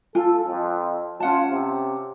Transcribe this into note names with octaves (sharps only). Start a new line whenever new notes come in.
F4 A4 G#5
F2
C#4 F4 F#5 A5
C3